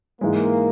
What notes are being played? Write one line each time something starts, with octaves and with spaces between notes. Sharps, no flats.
G#2 E3 G#3 A#3